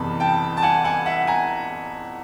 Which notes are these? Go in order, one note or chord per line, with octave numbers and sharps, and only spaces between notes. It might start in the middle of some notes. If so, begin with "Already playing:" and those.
Already playing: F#1 E2 C3 A5 B5
G5 A5
A5
F#5 G#5
F#5 G#5
E5 F#5
G#5 A#5